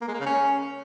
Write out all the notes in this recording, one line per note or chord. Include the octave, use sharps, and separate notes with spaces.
A#3
G#3
A#3
C#3
C#4